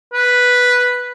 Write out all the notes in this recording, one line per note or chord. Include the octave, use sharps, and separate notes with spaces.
B4